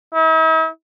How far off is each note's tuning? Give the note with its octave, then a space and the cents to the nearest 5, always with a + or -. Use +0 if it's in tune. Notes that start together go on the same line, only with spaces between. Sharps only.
E4 -45